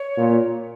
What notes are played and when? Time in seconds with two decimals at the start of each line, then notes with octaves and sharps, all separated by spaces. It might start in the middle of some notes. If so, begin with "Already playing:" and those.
Already playing: C#5
0.17 A#2